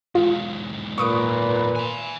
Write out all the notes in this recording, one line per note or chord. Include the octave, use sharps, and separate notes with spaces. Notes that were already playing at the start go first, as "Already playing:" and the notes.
E2 G#2 F4
A#2 B4 C#6 D#6 D7
G#5 B5